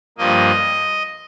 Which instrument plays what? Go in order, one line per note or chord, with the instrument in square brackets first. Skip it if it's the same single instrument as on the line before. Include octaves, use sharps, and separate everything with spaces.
[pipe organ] G2 F3 A#3 D#5